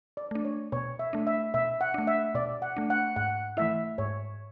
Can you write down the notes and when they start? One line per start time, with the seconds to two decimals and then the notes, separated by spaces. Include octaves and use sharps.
0.17 D5
0.31 A3 D4 D5
0.45 C#5
0.72 B2 C#5
0.99 E5
1.13 A3 D4
1.27 E5
1.54 B2 E5
1.81 F#5
1.94 A3 D4
2.07 E5
2.35 B2 D5
2.62 F#5
2.77 A3 D4
2.90 F#5
3.16 G#2 F#5
3.57 E3 A3 E4 E5
3.98 G#2 C#5